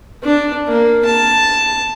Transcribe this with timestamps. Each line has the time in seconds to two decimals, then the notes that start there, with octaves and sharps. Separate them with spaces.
0.23 D4
0.68 A#3
1.05 A5